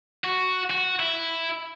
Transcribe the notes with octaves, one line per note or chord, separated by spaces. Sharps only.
F#4
F#4
E4